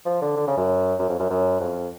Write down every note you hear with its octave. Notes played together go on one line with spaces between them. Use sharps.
F3
D3
D3
C#3
F#2
F#2
F2
F#2
F#2
F2